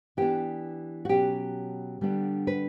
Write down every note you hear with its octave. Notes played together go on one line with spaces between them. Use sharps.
E3 B3 D4 G4
F#4
B2 F#3 C#4 G4
D3 G3 B3 D4
B4